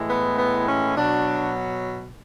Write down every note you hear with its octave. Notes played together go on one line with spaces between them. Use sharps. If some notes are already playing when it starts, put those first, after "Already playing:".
Already playing: A2 E3 G#3
B3
B3
C#4
B2 F#3 D4